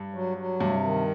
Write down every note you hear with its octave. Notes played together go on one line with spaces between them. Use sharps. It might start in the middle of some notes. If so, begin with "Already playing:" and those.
Already playing: G2
F#3
F#3
G2 C3
D#3